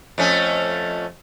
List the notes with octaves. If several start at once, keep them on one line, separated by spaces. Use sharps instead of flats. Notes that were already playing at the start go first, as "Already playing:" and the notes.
F2 A3 C#4